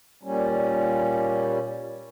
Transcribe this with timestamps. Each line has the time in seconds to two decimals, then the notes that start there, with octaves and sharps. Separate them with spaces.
0.23 A#2 G3 C#4